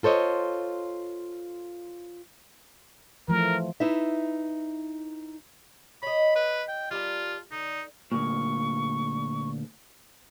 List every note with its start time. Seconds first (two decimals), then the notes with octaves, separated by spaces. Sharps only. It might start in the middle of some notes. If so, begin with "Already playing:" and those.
0.03 F4 A4 C5 C#5 D#5
3.28 E3 F3 A3 A#4
3.80 D#4 E4 B4 E5
6.03 C#5 D#5 B5
6.36 B4
6.68 G5
6.91 G3 F4 A#4 A5
7.52 D3 D#4
8.12 D2 A#2 C#6